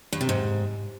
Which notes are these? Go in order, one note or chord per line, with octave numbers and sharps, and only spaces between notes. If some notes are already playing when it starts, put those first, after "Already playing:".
G2
C3
G#2